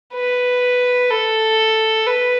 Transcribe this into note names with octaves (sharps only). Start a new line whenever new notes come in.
B4
A4
B4